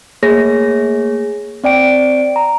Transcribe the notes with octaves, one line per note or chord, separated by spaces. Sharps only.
A3 A#3 G#4 C#5 A#6
C4 D5 G5 D7
A#5